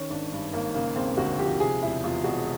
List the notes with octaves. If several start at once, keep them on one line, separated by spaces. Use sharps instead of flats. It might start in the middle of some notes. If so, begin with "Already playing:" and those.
Already playing: D#3 C#4
G#1 D4
G2
G#1 A#3
C#3 A#3
E1 C4
D2 F#4
F3 G4
C3 G#4
E1 E4
E2 F4
E1 F#4